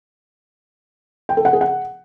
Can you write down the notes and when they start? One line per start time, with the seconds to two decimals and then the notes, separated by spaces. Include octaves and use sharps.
1.29 G5
1.37 A4
1.45 F#5
1.53 G#4
1.61 F#5